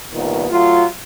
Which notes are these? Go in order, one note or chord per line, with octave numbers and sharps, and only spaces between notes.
C2 A#2 D#3 B3
F#3 A3 F4